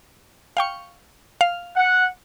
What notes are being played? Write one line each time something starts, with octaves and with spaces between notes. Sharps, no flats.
F5 G5 C#6
F5
F#5